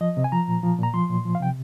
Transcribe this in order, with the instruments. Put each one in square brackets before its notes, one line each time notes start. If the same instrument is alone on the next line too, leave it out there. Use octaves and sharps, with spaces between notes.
[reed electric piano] F3 D#5
C3
G#5
F3 A#5
A#2
F3
A#2 A#5
F3 C6
A#2
F3
F5
C3 G5